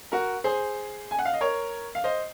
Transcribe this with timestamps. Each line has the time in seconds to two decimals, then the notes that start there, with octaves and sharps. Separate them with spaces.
0.12 F#4 A#4
0.44 G#4 C5
1.11 G#5
1.19 F#5
1.25 F5
1.33 D#5
1.41 A#4 C#5
1.95 F5
2.04 C5 D#5